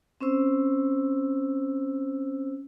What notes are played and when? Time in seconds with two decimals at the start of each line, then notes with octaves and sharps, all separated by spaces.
0.21 C4 C#4 C5 E6